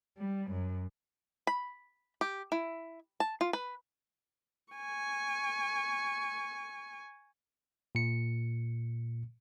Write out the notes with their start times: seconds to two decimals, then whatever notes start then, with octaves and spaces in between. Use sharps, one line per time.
0.18 G3
0.51 F#2
1.47 B5
2.21 G4
2.52 E4
3.20 A5
3.41 F4
3.53 B4
4.73 G#5 C#6
7.95 A#2 C#7